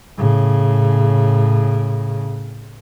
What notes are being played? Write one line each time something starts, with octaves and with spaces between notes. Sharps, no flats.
A2 C#3